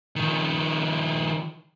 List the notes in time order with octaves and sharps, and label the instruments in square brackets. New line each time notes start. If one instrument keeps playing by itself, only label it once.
[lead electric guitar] D#3 F3